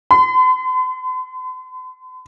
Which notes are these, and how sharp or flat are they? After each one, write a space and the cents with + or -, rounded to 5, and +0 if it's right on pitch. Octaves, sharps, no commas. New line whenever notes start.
C6 -45